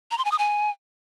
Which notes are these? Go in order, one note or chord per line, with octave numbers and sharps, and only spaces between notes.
A#5
C6
G#5
D#6
G#5